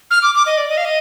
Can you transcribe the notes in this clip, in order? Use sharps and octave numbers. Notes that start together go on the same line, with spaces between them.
F6
D6
D6
D#5
D5
D#5
F5
D#5